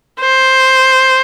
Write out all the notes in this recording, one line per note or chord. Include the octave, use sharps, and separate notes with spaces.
C5